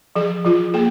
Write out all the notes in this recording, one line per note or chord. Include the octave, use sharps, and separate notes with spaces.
F3 G#4
F3 F4
A#3 G#4